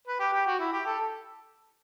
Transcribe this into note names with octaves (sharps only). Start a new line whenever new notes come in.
B4
G4
G4
F#4
E4
G4
A4